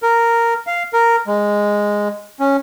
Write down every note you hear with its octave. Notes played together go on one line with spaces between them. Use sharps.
A#4
F5
A#4
G#3
C#4